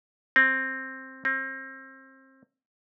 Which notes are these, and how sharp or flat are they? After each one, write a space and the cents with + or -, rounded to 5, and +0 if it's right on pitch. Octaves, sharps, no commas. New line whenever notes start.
C4 +10
C4 +30